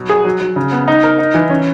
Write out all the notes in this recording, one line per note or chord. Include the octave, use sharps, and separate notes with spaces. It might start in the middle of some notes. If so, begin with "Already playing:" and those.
Already playing: B2 F#3
G#4
F#3
F#3
C#3
B3
D#4
A#4
D#4
E3
C#4